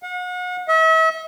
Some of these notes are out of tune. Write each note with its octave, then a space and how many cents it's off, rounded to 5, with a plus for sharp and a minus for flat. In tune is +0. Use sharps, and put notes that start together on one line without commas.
F#5 -40
E5 -40